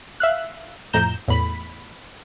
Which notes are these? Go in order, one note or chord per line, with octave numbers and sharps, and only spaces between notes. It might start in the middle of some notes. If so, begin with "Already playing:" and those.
E5 F5 F#6
F2 A2 A#5 G6 E7
E2 A2 B5